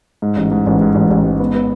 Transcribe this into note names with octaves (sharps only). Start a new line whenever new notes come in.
G#2
A1
G#2
A1
G#2
A1
A1
G#2
B3
B3